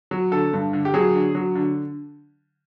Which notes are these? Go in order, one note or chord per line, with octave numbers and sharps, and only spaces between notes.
F#3
D3 A4
G2
D3
G4
F#3 G#4
D3
F#3
D3